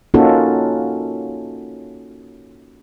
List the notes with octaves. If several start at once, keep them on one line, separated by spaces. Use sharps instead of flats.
A#3 C#4 D#4 F4 F#4 A4